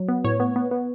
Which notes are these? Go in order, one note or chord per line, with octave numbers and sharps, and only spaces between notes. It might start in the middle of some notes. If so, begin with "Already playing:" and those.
Already playing: F#3
B3
A2 C#5
B3
B3
B3